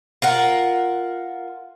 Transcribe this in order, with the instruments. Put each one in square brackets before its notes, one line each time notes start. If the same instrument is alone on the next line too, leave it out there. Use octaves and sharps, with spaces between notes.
[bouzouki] F4 A#4 F#5